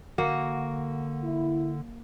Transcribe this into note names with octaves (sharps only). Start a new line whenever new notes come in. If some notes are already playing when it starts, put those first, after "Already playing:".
D3 A#3 F#4
E4